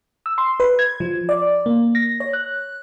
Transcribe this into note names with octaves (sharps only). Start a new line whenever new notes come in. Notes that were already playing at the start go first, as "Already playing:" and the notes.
E6
C6
B4
G#6
F3
D5
A#3
A#6
C#5
F#6